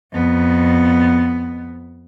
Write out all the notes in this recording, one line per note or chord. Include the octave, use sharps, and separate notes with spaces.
F2 B3